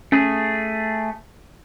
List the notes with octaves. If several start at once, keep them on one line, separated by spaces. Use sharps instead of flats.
A3 C#4 G#4